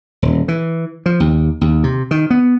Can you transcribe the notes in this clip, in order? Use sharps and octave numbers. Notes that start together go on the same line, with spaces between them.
D#1
E3
F3
D#2
D#2
C3
D#3
B3